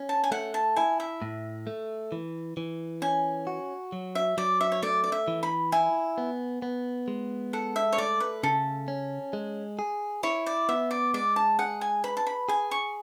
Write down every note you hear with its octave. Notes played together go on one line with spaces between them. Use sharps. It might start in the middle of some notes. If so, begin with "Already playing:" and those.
Already playing: C#4
A5
G#5
A3 F#5
A5
E4 G#5
E5
A2
A3
E3
E3
C#4 G#5
F#4
F#3
E5
F#3 D5
E5
C#5
A3 D5
D5
E5
E3
B5
E4 G#5
B3
B3
G#3
A4 F#5
E5
C#5
A3 D5
B4
C#3 A4
C#4
G#3
G#4
E4 C#5
D5
B3 E5
D5
G#3 D5
A5
G#4 F#5
G#5
B4 B5
A5
B5
G#4 G#5
C#6